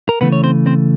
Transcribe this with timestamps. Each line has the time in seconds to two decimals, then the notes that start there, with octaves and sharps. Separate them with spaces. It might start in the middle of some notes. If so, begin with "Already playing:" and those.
0.09 A#4
0.21 C#3 E3 A3 B3 B4
0.32 C#5
0.44 C4 C5
0.66 C4 C5